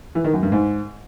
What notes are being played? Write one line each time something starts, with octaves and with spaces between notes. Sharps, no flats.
E3
D#3
F#2
G2
G#2